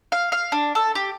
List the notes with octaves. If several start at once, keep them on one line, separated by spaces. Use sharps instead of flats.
F5
F5
D4
A4
G4